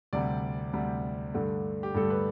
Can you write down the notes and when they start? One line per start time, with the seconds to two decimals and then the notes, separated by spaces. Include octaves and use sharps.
0.13 D2 C3 G3 D5
0.73 D2 C3 G3
1.34 G2 D3 A3
1.83 G4
1.94 G2 D3 A3 A4
2.10 B4